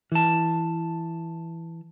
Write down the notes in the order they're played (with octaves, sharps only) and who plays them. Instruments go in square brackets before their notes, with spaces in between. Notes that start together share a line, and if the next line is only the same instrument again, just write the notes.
[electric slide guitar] E3 A5